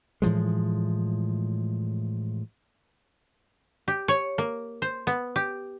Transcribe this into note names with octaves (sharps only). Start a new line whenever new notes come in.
A2 E3 F3 G#3
G4
C#5
A#3
C5
B3
G4